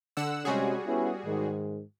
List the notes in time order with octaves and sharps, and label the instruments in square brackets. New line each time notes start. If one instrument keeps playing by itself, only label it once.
[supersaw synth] D3 F#5 E6
[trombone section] C3 G#3 C#4 [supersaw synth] G3 F#4 G#4
[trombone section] B3 C#4 E4
G#2 D#3